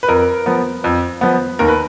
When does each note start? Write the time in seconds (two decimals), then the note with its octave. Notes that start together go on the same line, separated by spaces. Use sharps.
0.03 B4
0.08 F2 A#4
0.46 F3 B3
0.84 F2
1.21 F3 B3
1.59 D#2 A#4
1.68 B4